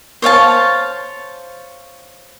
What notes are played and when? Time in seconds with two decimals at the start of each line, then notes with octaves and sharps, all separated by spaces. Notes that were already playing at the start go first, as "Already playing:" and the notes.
0.22 C5 C#5 F5 A5